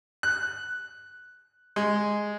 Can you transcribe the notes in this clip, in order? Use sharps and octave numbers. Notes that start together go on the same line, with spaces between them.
F#6
G#3